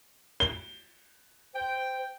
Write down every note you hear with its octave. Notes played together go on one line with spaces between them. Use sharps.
G7
C5 G5